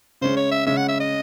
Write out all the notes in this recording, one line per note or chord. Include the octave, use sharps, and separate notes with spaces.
C#3 G#3 C#4 C5
C#5
E5
C#3 G#3 C#4 E5
F#5
E5
D#5